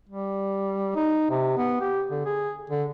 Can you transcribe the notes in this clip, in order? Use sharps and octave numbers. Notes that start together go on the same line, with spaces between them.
G3
D#4
C3
B3
G4
D3
G#4
D3